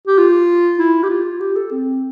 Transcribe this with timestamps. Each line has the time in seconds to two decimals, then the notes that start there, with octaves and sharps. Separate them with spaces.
0.07 G4
0.18 F4
0.79 E4
1.03 G4
1.10 F4
1.40 G4
1.56 A4
1.71 C4